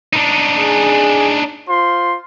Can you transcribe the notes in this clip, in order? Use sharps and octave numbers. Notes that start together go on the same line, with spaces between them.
D4 D#4
G#4
F4 C5 C6